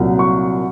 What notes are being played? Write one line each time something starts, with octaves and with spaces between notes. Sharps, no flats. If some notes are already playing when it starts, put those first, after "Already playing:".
Already playing: C2 A#2 F#3
C#6